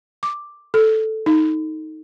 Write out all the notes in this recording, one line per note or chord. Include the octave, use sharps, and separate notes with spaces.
D6
A4
D#4